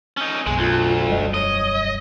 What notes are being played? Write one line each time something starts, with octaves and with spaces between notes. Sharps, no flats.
C#4 D#4
B1 F#2 B2 G#3
D2 F4
E1 F#2 G3 D#5
C#5 D#5